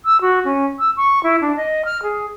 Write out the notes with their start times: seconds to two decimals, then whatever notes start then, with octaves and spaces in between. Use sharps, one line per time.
0.05 E6
0.21 F#4
0.44 C#4
0.79 E6
0.96 C#6
1.23 E4
1.41 D4
1.56 D#5
1.85 F6
2.02 G#4